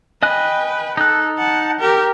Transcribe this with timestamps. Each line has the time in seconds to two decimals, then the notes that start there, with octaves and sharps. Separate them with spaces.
0.23 B4 D#5 G5 G#5 F#6
0.97 D#4 A4 F#6
1.39 F#5 A5
1.80 G4 A#4